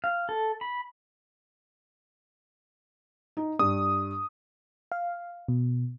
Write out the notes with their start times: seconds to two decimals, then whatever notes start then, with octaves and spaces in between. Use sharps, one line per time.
0.04 F5
0.29 A4
0.61 B5
3.37 D#4
3.59 G2 D#6
4.92 F5
5.48 B2